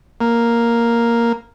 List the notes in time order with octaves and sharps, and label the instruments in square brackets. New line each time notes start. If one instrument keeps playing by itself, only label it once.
[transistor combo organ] A#3